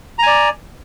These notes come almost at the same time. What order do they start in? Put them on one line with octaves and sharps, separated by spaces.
A#5 G#5 D5